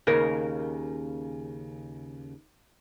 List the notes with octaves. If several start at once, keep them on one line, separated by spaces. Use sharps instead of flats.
D#2 C#3 A#4